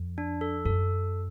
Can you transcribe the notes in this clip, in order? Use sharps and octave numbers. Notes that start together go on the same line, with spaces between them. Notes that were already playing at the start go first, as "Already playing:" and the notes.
Already playing: F2
D4
A4
F#2 A4